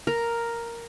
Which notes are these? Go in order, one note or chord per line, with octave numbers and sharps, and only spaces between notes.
A#4